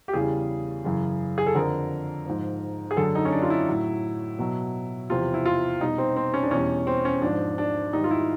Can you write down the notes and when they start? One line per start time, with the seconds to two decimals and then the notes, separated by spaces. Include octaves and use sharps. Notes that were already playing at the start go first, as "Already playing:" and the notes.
0.08 G4
0.13 E2 C#3 E3 G3 G#4
0.84 F#2 C#3 E3
1.38 G#4
1.47 A4
1.55 F2 D3 F3 A#4
2.26 G#2 F3
2.91 G#4
2.97 F#2 D3 F#3 A4
3.15 D#4
3.25 C#4
3.32 D4
3.42 F4
3.50 E4
3.68 A2 F#3
4.38 B2 F#3
5.10 E2 C3 F3 F4
5.34 E4
5.46 F4
5.80 B2 G3 D#4
5.98 C4
6.16 C4
6.34 C#4
6.43 D4
6.51 E2 B2 G3 C#4
6.87 C4
7.05 C#4
7.22 G#2 F3 D4
7.58 D4
7.93 G#2 D#3 G3 D#4
8.04 F4
8.11 E4